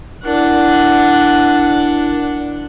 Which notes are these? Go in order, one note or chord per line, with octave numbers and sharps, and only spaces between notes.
D4 E4 A#4 F#5